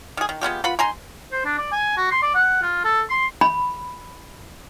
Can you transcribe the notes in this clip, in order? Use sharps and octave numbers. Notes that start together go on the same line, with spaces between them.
D#3 G#4
D#3
G#3 B3 F4 G4
F4 B4 F#5 B5
D#4 G#5 A#5 C6
C5
D4
D5
G#5
F#4
C6
D5
F#5
F4
A4
C6
B5